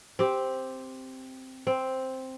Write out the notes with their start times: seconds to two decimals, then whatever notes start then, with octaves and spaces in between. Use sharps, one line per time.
0.19 C4 G4
1.67 C4